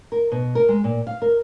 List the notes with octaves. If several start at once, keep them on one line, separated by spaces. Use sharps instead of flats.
A#4
B2
A#4
G#3
A#2
F5
A#4